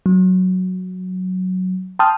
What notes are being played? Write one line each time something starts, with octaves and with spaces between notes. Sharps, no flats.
F#3
G5 A5 C6 D#6 F6